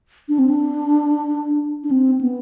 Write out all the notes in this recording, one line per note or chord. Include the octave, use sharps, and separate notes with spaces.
D4
C4
D4
D4
C4
B3